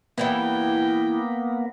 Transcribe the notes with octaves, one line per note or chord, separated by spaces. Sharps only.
E3 G3 A#3 B3 E4 G5